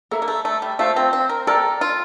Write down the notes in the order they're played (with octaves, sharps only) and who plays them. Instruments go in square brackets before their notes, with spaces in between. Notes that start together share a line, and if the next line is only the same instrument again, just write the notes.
[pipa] A#3 [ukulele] A4 E5 A#5
[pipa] A#3
A3
A3
G3
[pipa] A3 [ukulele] F4 C5 F5
[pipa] C4
C4
A#4
[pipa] A4 [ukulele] A#4 D5 G5 A#5
[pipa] F4